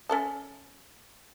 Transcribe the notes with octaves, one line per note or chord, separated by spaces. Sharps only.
C#4 A4 A5